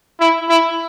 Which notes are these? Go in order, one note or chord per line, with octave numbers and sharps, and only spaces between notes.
E4
E4